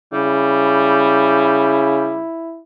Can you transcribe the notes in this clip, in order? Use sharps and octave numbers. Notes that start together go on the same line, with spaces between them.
C#3 G3 E4